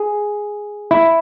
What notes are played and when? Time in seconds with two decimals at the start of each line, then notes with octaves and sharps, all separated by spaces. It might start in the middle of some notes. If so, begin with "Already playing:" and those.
Already playing: G#4
0.91 E4